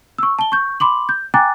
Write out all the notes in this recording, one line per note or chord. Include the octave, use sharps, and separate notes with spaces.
C#6 E6
A5 G7
C#6 G6
B5 C6 D6 F#7
G6
G5 G#5 A#5 D6 F#6 A6